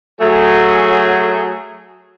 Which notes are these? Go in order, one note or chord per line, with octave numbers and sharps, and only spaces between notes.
F#3 A3 G#4